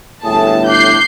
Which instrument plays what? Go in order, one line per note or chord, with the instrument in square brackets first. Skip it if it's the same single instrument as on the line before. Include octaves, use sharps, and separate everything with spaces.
[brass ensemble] G1 A2 [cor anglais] G#4 [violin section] A5
[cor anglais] D4 [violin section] G6 C7